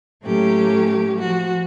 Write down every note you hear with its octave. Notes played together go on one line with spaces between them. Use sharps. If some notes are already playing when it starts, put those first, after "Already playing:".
A2 F#3 A#3 C#4 G4 A4
F3 F#4